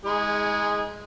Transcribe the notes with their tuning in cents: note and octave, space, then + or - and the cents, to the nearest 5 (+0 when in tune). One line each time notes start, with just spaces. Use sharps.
G#3 +0 D#4 +45 G#4 -10